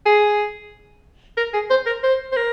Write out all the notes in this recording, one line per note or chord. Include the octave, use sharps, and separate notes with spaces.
G#4
A#4
G#4
C5
A#4
C5
C5
A#4